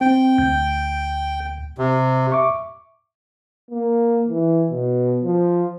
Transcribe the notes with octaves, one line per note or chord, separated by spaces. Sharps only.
C4 G5
D2 G6
C3
E5 C#6 D6
A#3
E3
B2
F3